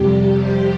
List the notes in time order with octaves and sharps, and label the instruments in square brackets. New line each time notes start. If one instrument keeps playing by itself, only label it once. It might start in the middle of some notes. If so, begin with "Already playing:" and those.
Already playing: [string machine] F2 C3 G3 G4
C5